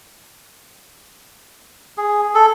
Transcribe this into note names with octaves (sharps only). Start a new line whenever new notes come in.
G#4
A4